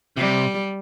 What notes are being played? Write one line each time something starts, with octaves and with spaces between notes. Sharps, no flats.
C3 G3